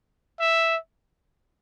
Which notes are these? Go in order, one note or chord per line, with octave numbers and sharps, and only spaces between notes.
E5